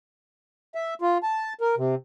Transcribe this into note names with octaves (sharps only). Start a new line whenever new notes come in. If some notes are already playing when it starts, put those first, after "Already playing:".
E5
F4
A5
A#4
C3